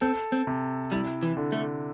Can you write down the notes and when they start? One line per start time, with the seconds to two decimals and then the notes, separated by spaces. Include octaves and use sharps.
0.01 C4 A4
0.32 C4
0.47 C3
0.92 G3 E4
1.23 E3
1.37 D3
1.52 A3